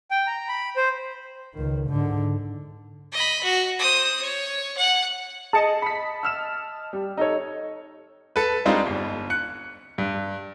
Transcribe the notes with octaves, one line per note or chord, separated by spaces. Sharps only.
G5
A#5
B5
C5
C#2 D#3
G#2 D3
D#5 B5
F#4
C5 D#6
C#5
F#5
G#4 D#5 A5 C#7
B5 B6
E6 F6 E7
G3
D#4 A4 C#5
A4 B4
G3 G#3 C4 D4 D#4 F4
G1
F#6 C#7
G2